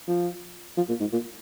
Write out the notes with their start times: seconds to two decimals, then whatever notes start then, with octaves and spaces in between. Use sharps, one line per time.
0.08 F3
0.77 F3
0.89 A#2
1.00 G#2
1.12 A#2